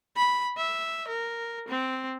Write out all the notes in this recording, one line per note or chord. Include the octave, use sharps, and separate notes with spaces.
B5
E5
A#4
C4